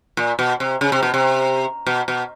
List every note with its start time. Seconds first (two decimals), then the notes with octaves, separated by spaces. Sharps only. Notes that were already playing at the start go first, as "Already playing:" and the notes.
0.17 A#2
0.39 B2
0.60 C3
0.81 C#3
0.92 C3
1.03 B2
1.14 C3
1.86 B2
2.08 B2